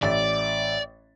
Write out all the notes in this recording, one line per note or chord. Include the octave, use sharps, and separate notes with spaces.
A1 D5 E5 A6